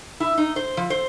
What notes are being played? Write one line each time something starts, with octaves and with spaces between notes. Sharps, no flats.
E4
D#4
C5
F3
C5